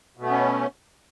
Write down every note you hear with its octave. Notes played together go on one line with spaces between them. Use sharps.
B2 A3 B3 C#4